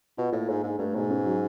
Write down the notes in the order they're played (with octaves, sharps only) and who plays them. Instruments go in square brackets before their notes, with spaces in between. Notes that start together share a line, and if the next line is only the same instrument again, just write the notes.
[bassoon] B2 [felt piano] F4
[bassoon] A2 [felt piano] A#3
[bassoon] G#2 [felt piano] A4
[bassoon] G#2 [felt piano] D4
[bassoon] G2 [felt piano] A3
[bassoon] G#2 [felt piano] B2
[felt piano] C#4
F#3